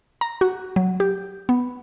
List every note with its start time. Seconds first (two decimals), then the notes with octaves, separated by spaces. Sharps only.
0.21 A#5
0.41 F#4
0.76 F#3
1.00 G4
1.49 B3